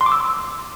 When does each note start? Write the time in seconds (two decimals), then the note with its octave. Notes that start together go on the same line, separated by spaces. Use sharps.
0.01 C6
0.06 D6
0.12 E6